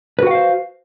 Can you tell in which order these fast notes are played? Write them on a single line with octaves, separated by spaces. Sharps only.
B4 F#4 F#5 F5 C5